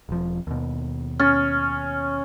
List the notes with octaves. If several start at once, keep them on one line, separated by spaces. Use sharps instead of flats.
E1 F3
D#2 B2
C#4 F6 A6